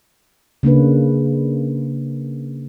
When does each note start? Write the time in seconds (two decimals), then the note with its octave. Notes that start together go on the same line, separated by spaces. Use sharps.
0.63 C#3 A#3 D4 B4